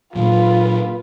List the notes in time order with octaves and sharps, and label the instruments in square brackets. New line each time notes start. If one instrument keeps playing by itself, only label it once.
[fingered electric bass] A#2 F#3 [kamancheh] F4 B4